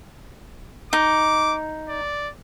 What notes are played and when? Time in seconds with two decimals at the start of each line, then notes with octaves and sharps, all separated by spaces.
0.93 D#4 D6
1.89 D5